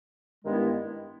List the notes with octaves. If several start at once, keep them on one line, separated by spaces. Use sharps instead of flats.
G2 D#3 G#3 B3 E4